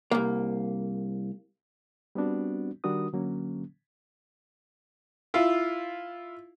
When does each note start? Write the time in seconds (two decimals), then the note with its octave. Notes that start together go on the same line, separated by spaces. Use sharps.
0.11 C2 A#3
2.15 G3 B3 C4 D4 F#4
2.84 D#3 G3 D4 F#4 A#4 D#6
3.13 D3 F#3 A#3 C#4
5.34 E4 F4